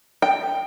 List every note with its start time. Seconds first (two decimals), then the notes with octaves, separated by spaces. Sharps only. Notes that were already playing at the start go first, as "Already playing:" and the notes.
0.22 G5